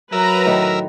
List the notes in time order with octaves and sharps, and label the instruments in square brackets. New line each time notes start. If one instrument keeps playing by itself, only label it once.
[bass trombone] F#3 [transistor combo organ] A#4 E5 [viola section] B4 A#5
[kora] A2 D#3